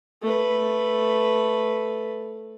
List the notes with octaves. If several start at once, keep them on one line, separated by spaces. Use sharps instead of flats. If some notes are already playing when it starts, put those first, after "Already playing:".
A3 B4